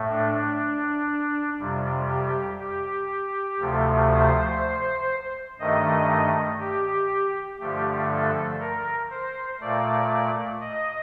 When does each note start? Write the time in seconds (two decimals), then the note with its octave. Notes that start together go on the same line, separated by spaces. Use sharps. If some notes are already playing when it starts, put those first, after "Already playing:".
Already playing: A2 A3
0.10 D4
1.59 F2 C3 G3
2.10 G4
2.60 G4
3.60 D2 C3 F3 A3
4.10 C5
5.60 G2 D#3 A3 D#5
6.60 G4
7.60 G2 D3 F3 A3 G4
8.11 A4
8.60 A#4
9.10 C5
9.60 A#2 A3 D5
10.61 D#5